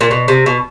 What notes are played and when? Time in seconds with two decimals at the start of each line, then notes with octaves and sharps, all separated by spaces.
0.01 A#2
0.11 B2
0.28 C3
0.46 B2